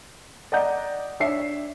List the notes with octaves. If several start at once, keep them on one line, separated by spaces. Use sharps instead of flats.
D5 D#5 F#5 A#5 G6
D4 C#5 E5 C7